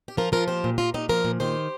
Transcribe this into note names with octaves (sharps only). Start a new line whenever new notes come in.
G4
F3 F4 A#4
F3 F4 A#4
A#2 G4 C5
A#2
A#2 F4 A#4
A#2 D#4 G4
F3 F4 A#4
A#2
D#3 G4 C5